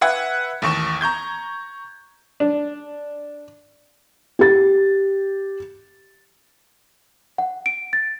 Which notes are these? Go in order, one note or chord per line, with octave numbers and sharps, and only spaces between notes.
B4 E5 F#5 G#6
A1 D#2 C#6 E7
A#5 C#6 G6 G#6
D4
G4 A6
F#5
D7
A6